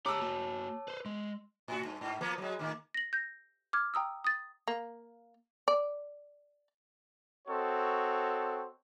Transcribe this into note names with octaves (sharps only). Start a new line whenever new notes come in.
G4 C#5 A5 A#5 D6 E6
A#3 F#4
B4 C5
G#3 C6
A2 F#4
G2
G#2
F3 A#3 B3
F#3 G#3
A2 D#3 A#3
A#6 F#7
G6 A#6
D6 F6 G#6
G5 A#5 D#6 E6
D#6 A6
A#3
D5
C4 F#4 A4 C#5 D#5